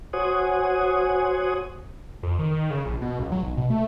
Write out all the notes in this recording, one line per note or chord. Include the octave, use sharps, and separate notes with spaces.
F#4 C5 C#5 F#5 G#5 D#6
F2
D#3
D#3
C#3
A#1
B2
C#2
F#3
B1
B2
A3